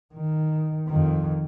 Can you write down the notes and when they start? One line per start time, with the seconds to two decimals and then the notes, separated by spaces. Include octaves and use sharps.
0.14 D#3
0.88 F2 D#3